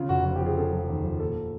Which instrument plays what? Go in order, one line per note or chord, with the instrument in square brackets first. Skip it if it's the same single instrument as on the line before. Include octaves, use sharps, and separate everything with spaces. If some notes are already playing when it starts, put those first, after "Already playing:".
Already playing: [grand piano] C#3 F4
F1 F#4
F3 F#4
G4
F3
G#4
C#3 A4
F3
D#2
F3
A#2 A4